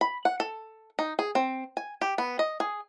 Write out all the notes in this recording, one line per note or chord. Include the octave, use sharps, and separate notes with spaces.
B5
F#5
A4
D#4
G#4
C4
G#5
G4
B3
D#5
G#4